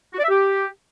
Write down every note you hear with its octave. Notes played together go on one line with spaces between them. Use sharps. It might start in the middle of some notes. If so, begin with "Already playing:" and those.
F#4
D5
E5
G4